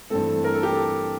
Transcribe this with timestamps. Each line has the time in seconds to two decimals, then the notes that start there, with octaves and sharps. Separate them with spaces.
0.10 G2 E3 A3 C4 A4
0.44 A#4
0.54 A4
0.63 G4
0.73 A4